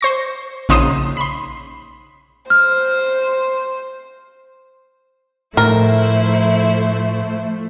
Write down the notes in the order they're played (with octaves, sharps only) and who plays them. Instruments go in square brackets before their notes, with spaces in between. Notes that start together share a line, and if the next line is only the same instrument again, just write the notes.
[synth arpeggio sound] C5 C#6 A#6
A#1 C#3 D#4 C6 D#6 E7
B5 C6
[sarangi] C5 [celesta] F6
[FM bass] A2 [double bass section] F3 A3 [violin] E4 C5 [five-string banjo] A#4